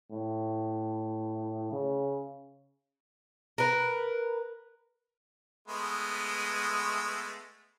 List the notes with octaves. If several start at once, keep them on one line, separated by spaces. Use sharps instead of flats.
A2
C#3
A#4 B4
G#3 A3 B3